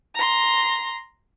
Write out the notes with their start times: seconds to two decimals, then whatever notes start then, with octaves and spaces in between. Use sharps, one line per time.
0.15 A#5 C6